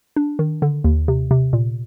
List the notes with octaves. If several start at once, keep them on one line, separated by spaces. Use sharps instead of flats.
D4
D#3
D3
D#2
C3
C3
A#2